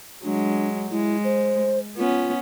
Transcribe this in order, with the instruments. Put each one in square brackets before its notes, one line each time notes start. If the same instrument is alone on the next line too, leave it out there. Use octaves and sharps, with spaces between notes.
[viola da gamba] F#3 G#3 [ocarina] D4
[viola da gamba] G#3 [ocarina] E4
[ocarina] C5
[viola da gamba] B3 C#4 [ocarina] F4